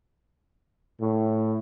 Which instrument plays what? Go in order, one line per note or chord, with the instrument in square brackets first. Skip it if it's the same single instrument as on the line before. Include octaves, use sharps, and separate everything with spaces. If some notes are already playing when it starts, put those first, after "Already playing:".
[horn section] A2